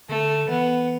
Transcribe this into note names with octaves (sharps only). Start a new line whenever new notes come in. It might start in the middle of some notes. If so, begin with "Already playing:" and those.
D3 A3
E3 B3